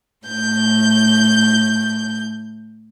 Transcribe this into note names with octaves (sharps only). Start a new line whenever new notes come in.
A2 G6